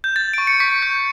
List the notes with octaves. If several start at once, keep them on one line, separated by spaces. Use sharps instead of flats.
G6
G6 A6
C#6 D7
C#7
C#6 B6
G6